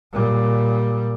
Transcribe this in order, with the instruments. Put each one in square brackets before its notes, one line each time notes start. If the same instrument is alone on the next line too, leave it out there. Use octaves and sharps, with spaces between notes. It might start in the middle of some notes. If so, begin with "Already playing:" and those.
[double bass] A#2 G3